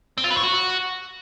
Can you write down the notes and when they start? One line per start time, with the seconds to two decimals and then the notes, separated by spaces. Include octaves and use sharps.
0.18 C4
0.24 F4
0.30 B4
0.37 C#5
0.43 F#4